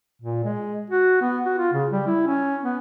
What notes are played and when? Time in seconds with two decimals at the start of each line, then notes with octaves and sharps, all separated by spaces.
0.22 A#2
0.44 G#3
0.90 F#4
1.21 B3
1.46 F#4
1.58 F4
1.73 C#3
1.92 G3
2.07 E4
2.27 C#4
2.64 B3